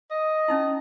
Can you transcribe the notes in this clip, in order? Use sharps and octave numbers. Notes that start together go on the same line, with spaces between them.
D#5
C#4 D#4 E4